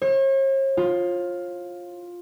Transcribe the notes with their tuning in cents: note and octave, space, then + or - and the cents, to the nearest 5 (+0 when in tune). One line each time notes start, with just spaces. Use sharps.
C#5 -45
F4 +10